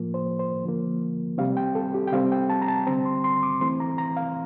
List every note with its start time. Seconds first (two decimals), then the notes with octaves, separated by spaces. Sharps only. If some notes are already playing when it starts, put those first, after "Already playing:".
Already playing: A2 F3 A#3
0.14 C5
0.39 C5
0.64 D3 F3 A#3
1.38 C3 G3 C4 F5
1.57 G5
1.75 A4
1.94 G4
2.07 G5
2.13 C3 G3 C4 F5
2.32 G5
2.50 A5
2.62 A#5
2.68 A5
2.87 D3 G3 C4 A#5
3.05 C6
3.24 C6
3.43 D6
3.61 E3 A3 C4 C6
3.80 A#5
3.98 A#5
4.17 F5